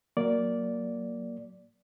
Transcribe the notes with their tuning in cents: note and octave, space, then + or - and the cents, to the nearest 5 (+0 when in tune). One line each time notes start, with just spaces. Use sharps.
F#3 +0 A#3 +0 D5 -10